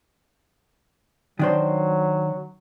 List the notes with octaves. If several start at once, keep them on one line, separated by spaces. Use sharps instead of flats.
D#3 F#3 D4 C5